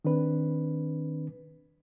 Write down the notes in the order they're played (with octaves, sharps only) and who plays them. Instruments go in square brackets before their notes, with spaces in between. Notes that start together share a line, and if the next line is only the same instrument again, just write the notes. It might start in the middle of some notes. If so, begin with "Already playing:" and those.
[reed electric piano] D#3 C4 D4 B4